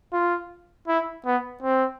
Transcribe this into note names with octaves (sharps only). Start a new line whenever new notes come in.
F4
E4
B3
C4